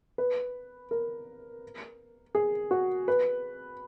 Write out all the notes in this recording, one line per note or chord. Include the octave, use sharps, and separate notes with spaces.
B4
A#4
G#4
F#4
B4